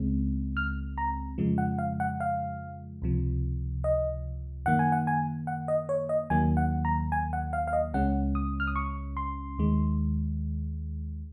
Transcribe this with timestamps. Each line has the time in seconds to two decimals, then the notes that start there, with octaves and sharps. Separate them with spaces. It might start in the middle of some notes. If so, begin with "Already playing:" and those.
Already playing: C#2 C#3 G#3 C4
0.57 F6
0.98 A#5
1.38 F2 C#3 F3 G#3
1.58 F#5
1.79 F5
2.00 F#5
2.20 F5
3.02 C#2 C3 F3
3.84 D#5
4.66 F#2 D#3 A#3 F#5
4.79 G#5
4.92 F#5
5.07 G#5
5.47 F#5
5.68 D#5
5.89 C#5
6.09 D#5
6.30 D#2 D#3 F#3 A#3 G#5
6.57 F#5
6.85 A#5
7.12 G#5
7.33 F#5
7.53 F5
7.68 F5
7.73 D#5
7.94 C#2 C#3 G#3 C#4 F#5
8.35 D#6
8.60 F6
8.67 D#6
8.76 C#6
9.17 C6
9.58 D#2 D#3 G#3